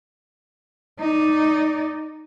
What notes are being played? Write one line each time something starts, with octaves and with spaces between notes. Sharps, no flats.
D#4 D5